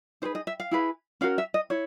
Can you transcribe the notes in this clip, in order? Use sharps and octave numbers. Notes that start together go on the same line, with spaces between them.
D#4 G#4 B4 C5
D#5
E5
F5
E4 G#4 B4
C#4 F#4 A#4 F5
E5
D#5
E4 C#5